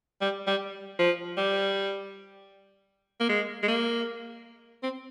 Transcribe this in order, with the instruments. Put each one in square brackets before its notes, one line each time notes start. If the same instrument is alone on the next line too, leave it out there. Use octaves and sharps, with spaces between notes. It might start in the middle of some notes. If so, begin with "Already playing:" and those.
[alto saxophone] G3
G3
F3
G3
A#3
G#3
G#3
A#3
C4